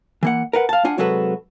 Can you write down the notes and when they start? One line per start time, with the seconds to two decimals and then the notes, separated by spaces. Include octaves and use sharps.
0.23 E3 A#3 F#5
0.53 A#4 B4 F#5
0.69 F5 A5
0.85 D4 F4 F#5 G#5
0.98 C3 F#3 G#3 F#4 A4 B4